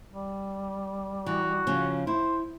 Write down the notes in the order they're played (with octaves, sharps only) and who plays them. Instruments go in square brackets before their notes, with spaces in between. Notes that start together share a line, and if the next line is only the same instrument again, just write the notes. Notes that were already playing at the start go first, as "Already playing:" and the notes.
[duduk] G3
[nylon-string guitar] E3 [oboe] F#4
[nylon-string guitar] C#3 F3 C#4
[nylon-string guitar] E4 [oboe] C5